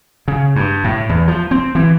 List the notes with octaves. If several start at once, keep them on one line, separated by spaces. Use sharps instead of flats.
C#3
G2
A2
E2
F3
C4
E3